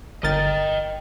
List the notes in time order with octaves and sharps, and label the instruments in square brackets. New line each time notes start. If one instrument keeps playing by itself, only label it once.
[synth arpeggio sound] G1 A#4 A6 [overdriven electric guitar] D#5 G5